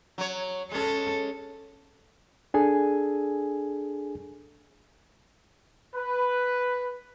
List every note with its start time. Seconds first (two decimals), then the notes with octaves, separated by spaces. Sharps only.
0.18 F#3 C#5
0.71 G#3 C#4 A4
2.54 D4 G#4 A4 G#5
5.96 B4